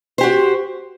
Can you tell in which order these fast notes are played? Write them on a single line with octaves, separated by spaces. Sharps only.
C5 G4 F#4